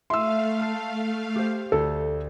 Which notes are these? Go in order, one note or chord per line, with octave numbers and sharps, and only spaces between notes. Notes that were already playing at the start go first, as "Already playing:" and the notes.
A3 E5 F5 C6 E6 F6 D#7
A5 F6 C7
G4 C5
D2 A4